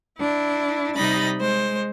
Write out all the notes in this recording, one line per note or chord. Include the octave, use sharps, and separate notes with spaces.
D4 E4
C3 G3 D#4 D#5 B5 A6
G#3 C5